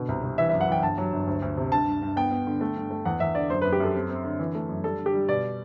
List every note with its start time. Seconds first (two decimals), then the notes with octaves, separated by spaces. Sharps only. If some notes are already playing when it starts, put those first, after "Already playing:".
Already playing: B2 D3
0.08 C2
0.23 C2
0.38 E3 E5
0.49 E5
0.53 F#2
0.61 F#5
0.68 E3 G5
0.83 G1 A5
0.98 F#3
1.12 G1
1.27 D2
1.42 D2
1.57 C3
1.72 G2 A5
1.87 G2
2.02 G2
2.16 B3 G5
2.31 B3
2.47 D3
2.61 A3
2.76 G2
2.91 A3
3.05 E2 F#5
3.20 E2 E5
3.35 D3 D5
3.50 F#2 C5
3.62 B4
3.65 F#2
3.72 G4
3.80 F#2 A4
3.95 C4
4.10 C4
4.24 D3
4.39 E3
4.55 A3
4.69 F#2
4.84 G3 A4
4.99 D3
5.06 G4
5.13 G3
5.28 B2 D5